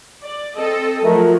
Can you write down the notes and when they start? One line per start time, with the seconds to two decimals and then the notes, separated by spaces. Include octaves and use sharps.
0.24 D5
0.56 C4 A4 D#5
1.04 F3 F#3 A3 A#4